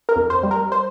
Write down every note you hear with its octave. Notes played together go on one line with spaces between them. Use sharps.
A#4
F2
C5
G3
A#4
C5